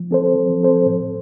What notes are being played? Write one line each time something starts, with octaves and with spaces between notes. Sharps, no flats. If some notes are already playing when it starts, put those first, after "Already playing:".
Already playing: F3
C4 A4 C5
F3
C4 A4 C5
A2